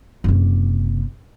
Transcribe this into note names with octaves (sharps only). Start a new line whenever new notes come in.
F#1 C3